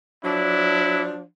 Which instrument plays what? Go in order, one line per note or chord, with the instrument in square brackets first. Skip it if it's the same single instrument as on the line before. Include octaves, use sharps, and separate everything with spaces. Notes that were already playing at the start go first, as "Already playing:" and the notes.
[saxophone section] F3 F#3 D4 [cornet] E4